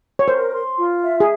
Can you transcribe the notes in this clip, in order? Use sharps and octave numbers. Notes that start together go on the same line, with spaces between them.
C#5
A#4 C5
C6
F4
E5
G#4